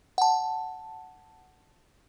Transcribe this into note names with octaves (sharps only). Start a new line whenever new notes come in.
F#5 A5